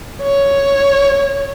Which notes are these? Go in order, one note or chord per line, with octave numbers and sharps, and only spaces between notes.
C#5